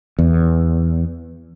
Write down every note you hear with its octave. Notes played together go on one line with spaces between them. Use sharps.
E2